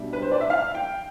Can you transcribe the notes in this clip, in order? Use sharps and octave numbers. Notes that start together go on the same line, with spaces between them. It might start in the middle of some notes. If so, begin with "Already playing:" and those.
Already playing: B2 G3 D4 E5
B4
C5
D5
E5
F5
G5